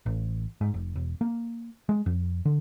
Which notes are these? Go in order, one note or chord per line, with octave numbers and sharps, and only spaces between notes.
A1
G#2
F1
E1
A#3
G#3
F2
D3